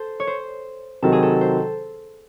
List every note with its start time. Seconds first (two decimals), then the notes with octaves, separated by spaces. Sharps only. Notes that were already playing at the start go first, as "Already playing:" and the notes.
Already playing: A4 C5
0.20 C#5
0.27 C5
1.03 C3 D#3 F#3 C4 A4
1.12 G#4
1.23 A4
1.41 C5